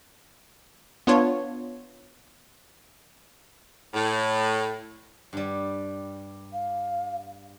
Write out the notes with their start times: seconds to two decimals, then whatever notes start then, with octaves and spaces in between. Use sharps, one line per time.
1.07 B3 D4 F4 C#5
3.94 A2
5.33 G2 G3
6.53 F5